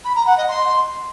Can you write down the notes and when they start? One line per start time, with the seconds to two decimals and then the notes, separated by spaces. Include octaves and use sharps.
0.04 B5
0.15 A#5
0.26 F#5
0.37 D#5
0.48 C6